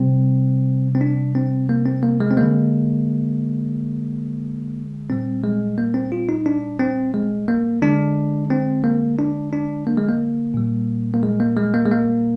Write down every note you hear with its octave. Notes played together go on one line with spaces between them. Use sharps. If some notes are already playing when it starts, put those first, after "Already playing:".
Already playing: C3 G3 C4
C4
D4
C4
A#3
C4
A#3
G#3
C4
D3 G#3 A#3
A#2 G3 C4
G#3
A#3
C4
F4
D#4
D4
C4
G#3
A#3
D3 G#3 D4
C4
A#3
D4
D4
A#3
G#3
A#3
A#2 G3
A#3
G#3
A#3
G#3
A#3
G#3
A#3